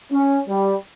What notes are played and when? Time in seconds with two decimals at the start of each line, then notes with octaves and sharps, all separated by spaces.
0.12 C#4
0.49 G3